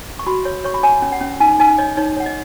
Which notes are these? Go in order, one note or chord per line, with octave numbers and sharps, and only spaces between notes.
C#6
F#4 B5
C#5
C#5 C#6
B5
C#5 G#5
C#4
F#5
C#4
D#4 G#5
D#4 G#5
C#5 D#5
D#4 C#5
C#5 F#5
D#5